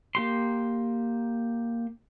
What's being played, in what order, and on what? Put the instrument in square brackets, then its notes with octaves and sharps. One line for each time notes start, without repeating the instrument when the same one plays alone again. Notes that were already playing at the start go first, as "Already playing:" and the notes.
[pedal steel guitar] A#3 G4 C6